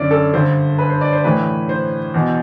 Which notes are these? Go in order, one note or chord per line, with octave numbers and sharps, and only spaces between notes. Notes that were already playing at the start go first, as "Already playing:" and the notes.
Already playing: F#2 D3 D5
A4
G2 D3 C5
B4
C5
D5
C5
A2 E3 B4
C5
E2 B2